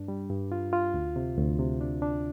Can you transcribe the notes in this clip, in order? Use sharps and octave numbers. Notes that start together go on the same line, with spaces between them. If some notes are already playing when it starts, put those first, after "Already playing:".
Already playing: G2 D4
G3
G2
F4
F4
D2
C3
D2
C3
D4
D4